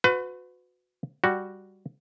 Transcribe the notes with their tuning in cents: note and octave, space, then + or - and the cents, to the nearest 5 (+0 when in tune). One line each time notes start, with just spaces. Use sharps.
F#4 -30 B4 +30
G3 +0 F#4 +0